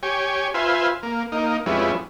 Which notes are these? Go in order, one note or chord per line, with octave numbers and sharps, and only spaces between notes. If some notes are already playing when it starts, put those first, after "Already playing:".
G4 C#5 G#5
F4 B4 C5 E5 G#5
A#3
A#3 D#4
F2 G3 G#3 B3 C#4 E4